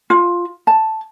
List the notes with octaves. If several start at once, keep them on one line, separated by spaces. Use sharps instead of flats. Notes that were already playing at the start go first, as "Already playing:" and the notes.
F4
A5